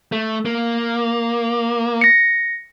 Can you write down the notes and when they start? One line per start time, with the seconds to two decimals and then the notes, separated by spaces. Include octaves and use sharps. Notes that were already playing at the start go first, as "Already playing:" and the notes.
0.12 A3
0.45 A#3
2.01 A#6 C#7